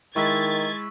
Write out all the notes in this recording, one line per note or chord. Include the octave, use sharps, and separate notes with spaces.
D#3 G#3 E4 C#6 E6 G#6 A6 B6